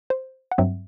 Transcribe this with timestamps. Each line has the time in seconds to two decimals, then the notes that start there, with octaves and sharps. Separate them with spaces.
0.10 C5
0.52 F#5
0.58 G2 F#3 C4 E5